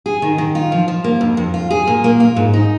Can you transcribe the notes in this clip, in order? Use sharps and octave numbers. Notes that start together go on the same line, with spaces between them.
G#4
D#3
D#3
F4
F3
F3
A#3
F2
F2
F4
G#4
A#2
A#3
F4
G#2
D#4